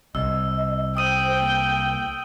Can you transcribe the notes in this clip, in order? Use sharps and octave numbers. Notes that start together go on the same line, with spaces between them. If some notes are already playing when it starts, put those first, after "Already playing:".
C2 D#5 E6
C5 G5 D#6 D#7
A#3